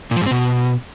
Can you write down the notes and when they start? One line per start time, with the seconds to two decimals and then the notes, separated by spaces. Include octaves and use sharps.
0.11 A#2
0.16 F3
0.21 G#2
0.26 C4
0.31 B2